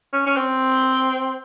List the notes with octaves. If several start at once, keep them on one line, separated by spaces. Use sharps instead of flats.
C#4
C#4
C4